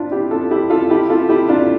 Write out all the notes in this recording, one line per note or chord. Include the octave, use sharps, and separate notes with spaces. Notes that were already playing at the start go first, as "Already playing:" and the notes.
Already playing: C4 D4 E4 F4
E4 G4
F4 A4
E4 G4
F4 A4
E4 G4
F4 A4
E4 G4
D4 F4